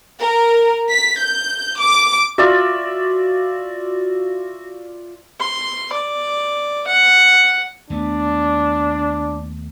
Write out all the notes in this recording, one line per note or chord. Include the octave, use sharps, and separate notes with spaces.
A#4
B6
G6
D6
F4 F#4 D5 E5
C6
D5
F#5
D#2 A3 B3 D4